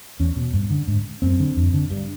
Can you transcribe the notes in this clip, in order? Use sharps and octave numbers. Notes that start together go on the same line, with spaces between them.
E2 C#4
B2
G2
D3
G#2
F#2 C4
D3
F2
D3
G2